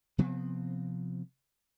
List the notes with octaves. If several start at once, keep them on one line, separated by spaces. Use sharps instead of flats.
C3 F3 B3 C4